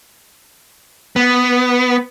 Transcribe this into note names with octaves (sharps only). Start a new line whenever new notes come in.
B3